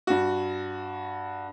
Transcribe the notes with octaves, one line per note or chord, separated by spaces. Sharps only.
G2 F#4